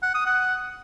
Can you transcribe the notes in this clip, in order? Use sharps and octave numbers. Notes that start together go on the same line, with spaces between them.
F#5
D#6
F#5